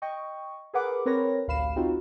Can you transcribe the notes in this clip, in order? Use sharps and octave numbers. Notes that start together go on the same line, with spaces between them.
D#5 G5 C#6
G#4 A#4 B4 F#5 D6
C4 A#4 B4 C#5 A#6
A1 D2 F5 B5 C7 E7
C4 D#4 F4 F#4